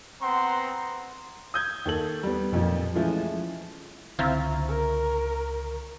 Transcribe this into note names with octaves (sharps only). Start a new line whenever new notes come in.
B3 C4 F#5 A#5 C6
D#6 G6 G#6
D#2 A4 F#7
G3 B3
B1 F2 A#2 F3
E3 F3 G#3 A3 C#4 F4
C#2 D3 C4 E4 F4 A#5 C#6
A#4